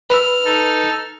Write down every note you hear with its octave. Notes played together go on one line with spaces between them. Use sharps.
B4 E6 F6
D#4 A4